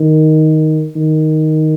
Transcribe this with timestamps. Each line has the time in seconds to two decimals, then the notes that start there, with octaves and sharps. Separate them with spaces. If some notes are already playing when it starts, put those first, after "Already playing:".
Already playing: D#3
0.96 D#3